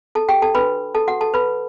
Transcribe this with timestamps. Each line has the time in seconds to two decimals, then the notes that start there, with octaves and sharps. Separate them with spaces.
0.15 A4 A5
0.29 G4 G5
0.42 A4 A5
0.55 D4 F#4 A4 B4 B5
0.94 A4 A5
1.07 F#4 F#5
1.21 A4 A5
1.34 B4 B5